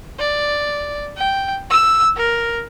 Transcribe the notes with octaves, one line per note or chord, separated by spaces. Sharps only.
D5
G5
E6
A#4